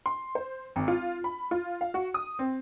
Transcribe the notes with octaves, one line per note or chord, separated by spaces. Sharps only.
C6
C5
G#1
F4
B5
F4
F5
F#4
D#6
C4